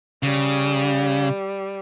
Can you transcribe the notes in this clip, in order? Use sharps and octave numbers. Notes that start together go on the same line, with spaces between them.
C#3 G3